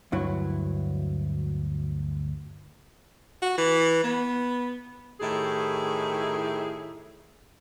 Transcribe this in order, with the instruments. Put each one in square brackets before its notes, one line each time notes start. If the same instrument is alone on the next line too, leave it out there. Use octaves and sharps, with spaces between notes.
[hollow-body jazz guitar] D2 G2 F#3 E4
[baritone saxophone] F#4
E3
B3
[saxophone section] A2 D#3 E4 G4 G#4